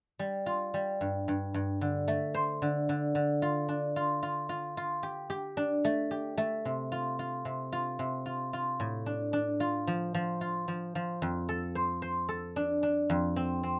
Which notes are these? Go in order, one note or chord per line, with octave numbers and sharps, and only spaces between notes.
G3
F4
G3
G2
G2
G2
D3
A3
C5
D3
D3
D3
F4
D4
F4
F4
F4
F4
G4
G4
D4
A3
G4
A3
C3
F4
F4
C3
F4
C3
F4
F4
A2
D4
D4
F4
F3
F3
F4
F3
F3
F2
A4
C5
C5
A4
D4
D4
F2
C4
C4